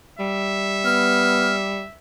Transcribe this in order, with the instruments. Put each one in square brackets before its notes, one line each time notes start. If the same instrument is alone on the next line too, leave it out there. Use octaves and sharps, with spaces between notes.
[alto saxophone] G3 [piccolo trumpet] E5
[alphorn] B3 [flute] F6